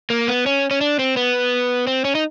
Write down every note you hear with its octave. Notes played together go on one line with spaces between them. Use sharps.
A#3
B3
C#4
C#4
D4
C4
B3
C4
C#4
D#4